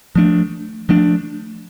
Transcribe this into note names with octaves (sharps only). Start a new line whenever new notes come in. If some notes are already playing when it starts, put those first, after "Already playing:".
F3 A3 D4
F3 A3 D4